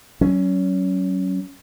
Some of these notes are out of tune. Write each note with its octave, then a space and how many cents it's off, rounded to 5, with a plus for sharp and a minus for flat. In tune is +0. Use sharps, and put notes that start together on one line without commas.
F#3 +30 C#4 +0